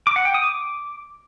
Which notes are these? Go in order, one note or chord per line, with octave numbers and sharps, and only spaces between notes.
D6
F#5
G5
D#6
D6